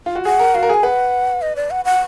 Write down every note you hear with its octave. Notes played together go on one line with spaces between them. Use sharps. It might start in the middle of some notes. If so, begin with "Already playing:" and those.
F4
F#4
G#4 F#5
A#4
F#4 F5
A#4
G#4 G#5
B4 F#5
D#5
D5
F#5
F#5